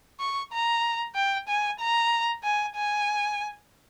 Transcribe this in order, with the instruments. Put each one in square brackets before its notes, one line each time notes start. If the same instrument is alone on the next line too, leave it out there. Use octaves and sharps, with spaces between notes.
[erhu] C#6
A#5
G5
G#5
A#5
G#5
G#5